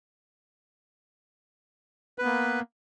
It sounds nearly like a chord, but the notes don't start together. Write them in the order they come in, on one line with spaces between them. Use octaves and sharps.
B4 B3 A#3